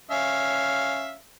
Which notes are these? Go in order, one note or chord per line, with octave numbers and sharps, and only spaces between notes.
C#4 E5 F5